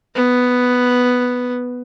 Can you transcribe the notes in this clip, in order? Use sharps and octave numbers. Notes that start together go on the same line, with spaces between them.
B3